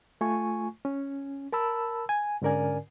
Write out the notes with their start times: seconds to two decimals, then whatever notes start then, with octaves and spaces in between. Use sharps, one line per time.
0.21 A3 F4 G#5 C#6
0.85 C#4
1.53 A#4 A5 B5 E6
2.09 G#5
2.42 G#2 D3 C#4 A#4 D5 G#5